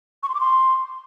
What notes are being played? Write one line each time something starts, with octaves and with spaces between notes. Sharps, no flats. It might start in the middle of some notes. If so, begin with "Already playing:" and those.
C#6
C6
D6
C6